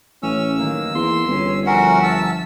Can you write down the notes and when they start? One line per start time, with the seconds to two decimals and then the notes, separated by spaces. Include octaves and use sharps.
0.23 A1 C#4 E6
0.58 D#3 F#3 A#3
0.95 E2 A#3 C6
1.27 G1 C#4
1.67 F3 C#4 F#4 A#4 E5 F#5
2.03 A5 E6